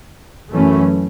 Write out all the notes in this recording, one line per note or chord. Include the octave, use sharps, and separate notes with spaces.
F#2 E3 A3 C#4